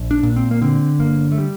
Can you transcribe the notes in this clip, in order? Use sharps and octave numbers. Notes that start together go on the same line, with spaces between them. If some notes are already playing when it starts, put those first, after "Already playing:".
Already playing: A#1
D4
A#2
C4
A#3
D3 C4
G1 A#3
A3
G3